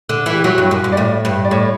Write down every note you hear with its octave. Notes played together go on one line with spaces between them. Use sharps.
D3
E3
G4
F#3 F#4
G2
F#2
G2
D5
A2 E5
G2
D5
A2 C#5